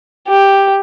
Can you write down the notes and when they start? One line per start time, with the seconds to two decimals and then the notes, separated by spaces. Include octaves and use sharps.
0.28 G4